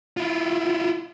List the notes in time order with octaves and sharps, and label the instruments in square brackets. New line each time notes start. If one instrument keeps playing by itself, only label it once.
[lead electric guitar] E4 F4